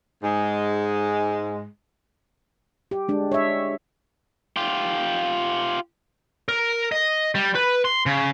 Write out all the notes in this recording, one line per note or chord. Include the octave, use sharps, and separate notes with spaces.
G#2 G#3
G4
G#3 D4
C#5 E5
F4 G4
A#4
D#5
G3
B4
C6
C#3